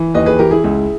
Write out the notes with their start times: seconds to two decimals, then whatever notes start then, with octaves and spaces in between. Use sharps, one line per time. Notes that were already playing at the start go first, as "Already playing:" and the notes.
Already playing: E3
0.14 D#2 B4 D#5
0.26 G#4 B4
0.39 E3 G4 A#4
0.51 E4 G#4
0.64 C#2